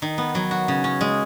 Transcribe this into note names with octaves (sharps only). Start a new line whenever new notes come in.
D#3
B3
F#3
F#4
C#3
C#4
G#3